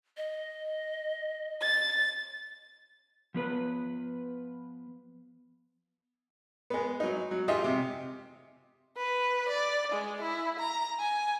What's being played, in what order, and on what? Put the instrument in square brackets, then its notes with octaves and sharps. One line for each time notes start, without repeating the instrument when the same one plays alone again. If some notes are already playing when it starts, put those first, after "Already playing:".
[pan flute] D#5
[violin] A6
[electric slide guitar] F3 B3 B4
[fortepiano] G#3 B3
F#3 D#4
F#3
D#4 F4 G4 G#4 D#5 E5
C3
[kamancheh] B4
D5
G#3
E4
A#5
G#5